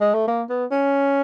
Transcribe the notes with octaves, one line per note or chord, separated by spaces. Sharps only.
G#3
A3
A#3
B3
C#4